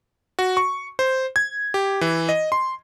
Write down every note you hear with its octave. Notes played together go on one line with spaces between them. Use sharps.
F#4
C#6
C5
G#6
G4
E3
D#5
C6